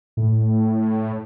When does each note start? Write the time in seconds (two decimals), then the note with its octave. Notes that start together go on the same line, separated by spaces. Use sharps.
0.17 A2